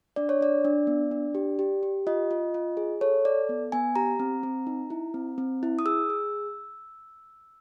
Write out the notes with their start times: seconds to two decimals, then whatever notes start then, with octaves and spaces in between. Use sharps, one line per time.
0.16 D4 D5
0.29 C#5
0.41 D4 D5
0.65 D4
0.87 B3
1.11 D4
1.35 G4
1.59 G4
1.83 G4
2.07 F4 D#5
2.31 F4
2.54 F4
2.77 G#4
3.01 A4 C#5
3.25 A4 D5
3.49 B3
3.72 B3 G#5
3.96 G4 A#5
4.20 C4
4.43 C4
4.67 D#4
4.90 E4
5.14 C4
5.38 C4
5.63 E4
5.79 D#6
5.85 G#4 E6
6.10 G#4